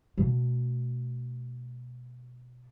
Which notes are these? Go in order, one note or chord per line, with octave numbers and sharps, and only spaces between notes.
B2 A3